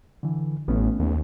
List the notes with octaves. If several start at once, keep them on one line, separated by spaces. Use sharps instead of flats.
D3 E3
A1 A3 B3 C#4
D#2